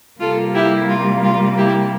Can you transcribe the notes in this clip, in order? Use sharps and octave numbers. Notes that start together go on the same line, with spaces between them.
C3 G3 A#3 F4 A4
E4 G4
F4
F4
E4 G4